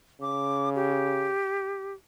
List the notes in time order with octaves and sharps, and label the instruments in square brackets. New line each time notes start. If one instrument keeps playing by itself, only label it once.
[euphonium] C#3 [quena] D6
[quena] G4